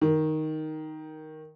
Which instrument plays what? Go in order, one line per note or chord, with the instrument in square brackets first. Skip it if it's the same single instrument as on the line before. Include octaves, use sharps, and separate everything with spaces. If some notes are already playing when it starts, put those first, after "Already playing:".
[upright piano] D#3